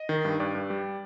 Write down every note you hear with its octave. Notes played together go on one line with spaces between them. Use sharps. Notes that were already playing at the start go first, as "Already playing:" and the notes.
Already playing: D#5
D#3
G2
G2 D5
G2
G3